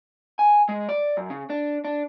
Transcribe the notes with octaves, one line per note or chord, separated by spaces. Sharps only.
G#5
G#3
D5
F#2
C#3
D4
D4